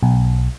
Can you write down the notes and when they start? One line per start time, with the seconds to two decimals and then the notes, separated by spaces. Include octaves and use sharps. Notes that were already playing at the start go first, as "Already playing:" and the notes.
0.03 B1